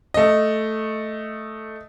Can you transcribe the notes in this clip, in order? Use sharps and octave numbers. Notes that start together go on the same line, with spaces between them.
A3 D#5